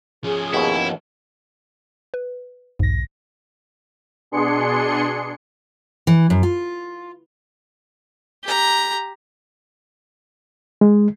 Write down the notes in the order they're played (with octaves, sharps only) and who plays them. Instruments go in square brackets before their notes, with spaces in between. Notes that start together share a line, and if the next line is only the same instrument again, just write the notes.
[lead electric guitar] F3 C#4 [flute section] G#4
[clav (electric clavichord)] D#2 B2 [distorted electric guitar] E4
[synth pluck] B4
[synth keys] B1 A#6 [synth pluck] E2 G#2
[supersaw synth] B2 D4 G#4 C6 C#7
[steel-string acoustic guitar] E3
F#2
F4
[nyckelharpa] G4 A#5
[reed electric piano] G#3